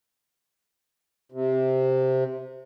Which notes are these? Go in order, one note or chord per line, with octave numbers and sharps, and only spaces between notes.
C3